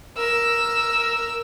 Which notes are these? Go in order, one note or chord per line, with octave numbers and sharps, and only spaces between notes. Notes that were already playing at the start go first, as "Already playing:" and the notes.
A#4 E6